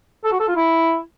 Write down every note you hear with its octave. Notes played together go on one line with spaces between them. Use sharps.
A4
F#4
A4
F4
E4